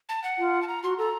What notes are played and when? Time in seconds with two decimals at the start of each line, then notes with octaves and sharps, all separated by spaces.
0.09 A5
0.24 F#5
0.38 F4
0.62 A5
0.68 A#5
0.83 F#4 C6
0.98 A4 A#5